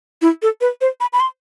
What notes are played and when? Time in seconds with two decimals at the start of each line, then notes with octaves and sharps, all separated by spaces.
0.22 E4
0.42 A4
0.61 B4
0.81 C5
1.00 B5
1.13 B5
1.20 C6